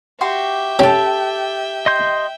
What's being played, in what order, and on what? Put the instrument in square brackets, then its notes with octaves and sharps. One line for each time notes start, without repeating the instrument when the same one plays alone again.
[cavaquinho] F#4 G4 C6 [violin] E5 G5
[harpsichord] C#4 [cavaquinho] G4 A4
[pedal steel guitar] D#5 C6 G6